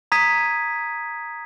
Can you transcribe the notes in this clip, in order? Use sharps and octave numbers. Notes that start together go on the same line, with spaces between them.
A#5 D#6 G#6 B6 D#7